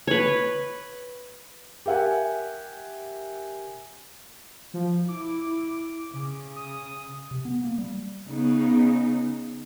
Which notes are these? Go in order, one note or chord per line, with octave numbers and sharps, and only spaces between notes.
B4 C#5
G4 A#4 E5 F#5 G#5
F3
E4 D6
C#3
D#6
C3
B3
A#3
G3
C#3 B3 D#4